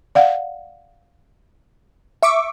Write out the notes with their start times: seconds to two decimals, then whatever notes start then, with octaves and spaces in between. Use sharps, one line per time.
0.15 D5 F5 F#5
2.23 E5 C#6 D6